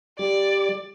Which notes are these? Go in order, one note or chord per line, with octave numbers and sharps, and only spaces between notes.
G3 D5 A6